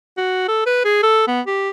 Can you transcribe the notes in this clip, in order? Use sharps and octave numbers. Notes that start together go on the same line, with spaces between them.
F#4
A4
B4
G#4
A4
B3
G4